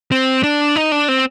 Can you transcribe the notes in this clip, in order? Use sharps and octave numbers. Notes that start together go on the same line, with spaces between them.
C4
D4
D#4
D4
C4